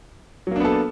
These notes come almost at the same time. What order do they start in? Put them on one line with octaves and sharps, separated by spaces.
F#3 A#3 D4 B3 A4